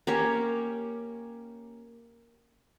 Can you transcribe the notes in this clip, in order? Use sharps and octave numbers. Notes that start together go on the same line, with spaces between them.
A#3 C#4 G4 C#5